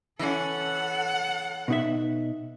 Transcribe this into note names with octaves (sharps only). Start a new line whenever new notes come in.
E3 C#4 A4 F#5
B2 D#4 E5